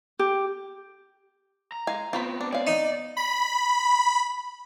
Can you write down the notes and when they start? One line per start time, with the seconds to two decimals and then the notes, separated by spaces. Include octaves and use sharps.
0.19 G4
1.72 A#5
1.87 G#3 F5 G#5
2.13 B3 C4 F4 C#5 B5
2.41 D4
2.53 C#4 D5 F5
2.67 D#4
3.17 B5